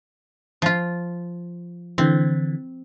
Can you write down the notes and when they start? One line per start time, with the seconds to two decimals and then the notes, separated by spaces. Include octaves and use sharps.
0.62 F3 F4
1.98 D3 E3 C4